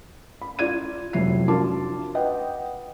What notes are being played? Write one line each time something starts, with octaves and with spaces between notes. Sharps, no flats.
B5
F4 D5 G#6 D#7
F1 F3 F#3 E4 C7
D4 F4 F#4 A#4 A5 D6
B4 D#5 F#5 G5